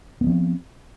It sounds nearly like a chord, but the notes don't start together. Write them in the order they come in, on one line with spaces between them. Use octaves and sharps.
B3 F#3 F3 C4